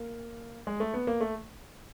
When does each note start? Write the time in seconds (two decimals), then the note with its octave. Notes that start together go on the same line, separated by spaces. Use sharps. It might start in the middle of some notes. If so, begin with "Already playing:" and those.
Already playing: A#3
0.67 G#3
0.80 A3
0.94 B3
1.07 A#3
1.21 A3